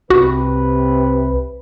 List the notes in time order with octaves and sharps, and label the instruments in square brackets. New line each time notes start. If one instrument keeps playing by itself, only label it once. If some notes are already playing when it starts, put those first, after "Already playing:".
[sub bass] C2 [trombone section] C3 B4 [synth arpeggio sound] F#4